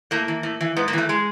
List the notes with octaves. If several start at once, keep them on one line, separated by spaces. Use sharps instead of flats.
A2 A#3
E3
A2
E3
G#2 B3
A#3
E3 A3
G#3